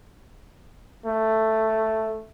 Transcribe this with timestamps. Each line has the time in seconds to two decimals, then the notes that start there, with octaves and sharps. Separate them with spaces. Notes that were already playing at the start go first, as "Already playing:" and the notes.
1.05 A3